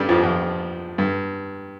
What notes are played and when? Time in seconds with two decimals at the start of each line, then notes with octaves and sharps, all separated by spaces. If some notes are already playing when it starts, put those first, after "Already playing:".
Already playing: G2 G3
0.09 F2 F3
0.23 F2
0.98 G2